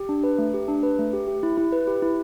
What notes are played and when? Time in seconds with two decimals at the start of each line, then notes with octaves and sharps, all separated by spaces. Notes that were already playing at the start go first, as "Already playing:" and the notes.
Already playing: G4
0.09 D4
0.24 B4
0.38 A3
0.54 G4
0.68 D4
0.83 B4
0.99 A3
1.13 G4
1.27 G4
1.43 E4
1.57 E4
1.72 B4
1.87 G4
2.02 E4